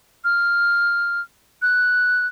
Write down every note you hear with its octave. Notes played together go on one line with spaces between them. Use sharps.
F6
F#6